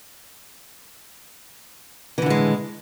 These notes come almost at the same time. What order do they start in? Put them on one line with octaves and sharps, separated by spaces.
E3 D3 A2 G#3